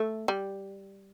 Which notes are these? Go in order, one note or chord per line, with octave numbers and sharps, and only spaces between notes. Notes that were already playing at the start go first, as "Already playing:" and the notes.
Already playing: A3
G3